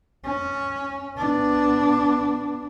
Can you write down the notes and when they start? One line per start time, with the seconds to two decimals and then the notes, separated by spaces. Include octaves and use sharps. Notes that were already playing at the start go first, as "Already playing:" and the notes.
0.24 C#4
1.18 B3 D4